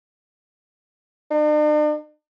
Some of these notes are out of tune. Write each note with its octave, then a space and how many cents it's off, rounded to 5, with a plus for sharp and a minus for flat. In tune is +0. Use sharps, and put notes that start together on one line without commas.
D4 +45